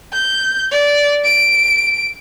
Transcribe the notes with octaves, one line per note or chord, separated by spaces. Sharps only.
G6
D5
D7